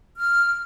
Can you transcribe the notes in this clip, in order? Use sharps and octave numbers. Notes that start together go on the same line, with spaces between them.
F6